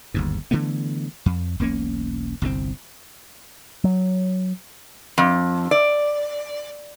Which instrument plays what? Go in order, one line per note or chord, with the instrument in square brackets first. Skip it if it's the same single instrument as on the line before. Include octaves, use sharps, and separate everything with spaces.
[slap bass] G1 D#2 G#2
D3 E3 A3 B3
F2
E1 B1 A#3 C#4
G1 C2 C3 C4
[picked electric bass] F#3
[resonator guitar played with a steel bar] F2
D5